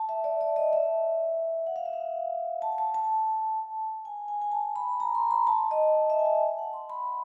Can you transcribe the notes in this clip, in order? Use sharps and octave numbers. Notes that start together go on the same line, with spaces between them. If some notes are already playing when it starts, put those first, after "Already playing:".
Already playing: A5
E5
D5
D5
D#5
E5
F#5
F5
E5
F5
A5
A5
A5
G#5
G#5
G#5
A5
B5
A#5
C6
B5
A5
D#5
D#5
E5
G#5
A5
F#5
C6
B5